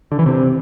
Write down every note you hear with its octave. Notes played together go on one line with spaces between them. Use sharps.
D3
E3
C3